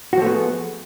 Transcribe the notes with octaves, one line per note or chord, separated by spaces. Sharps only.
F3 A3 B3 F#4 G#4